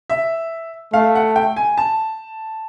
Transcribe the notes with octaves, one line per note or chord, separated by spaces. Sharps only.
E5
A3 F5
F#5
G5
G#5
A5